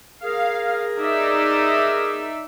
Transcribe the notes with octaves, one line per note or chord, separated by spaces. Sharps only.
G#4 A#4 F5
D#4 D5 E5